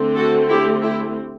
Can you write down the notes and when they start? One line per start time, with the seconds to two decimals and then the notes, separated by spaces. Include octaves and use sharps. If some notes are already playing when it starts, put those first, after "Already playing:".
Already playing: D3 A3 C4
0.16 F#4 A4
0.49 E4 G4
0.82 E4 G4